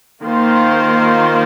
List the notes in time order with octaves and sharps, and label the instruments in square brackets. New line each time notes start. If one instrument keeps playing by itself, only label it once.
[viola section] D#3 A#3 F4 C5